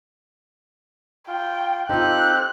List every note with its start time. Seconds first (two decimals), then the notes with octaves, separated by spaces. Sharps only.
1.28 F4 G5
1.89 C4 D#4 F4 G4 A4 F#6